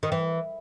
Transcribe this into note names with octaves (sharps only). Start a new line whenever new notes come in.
D#3
E3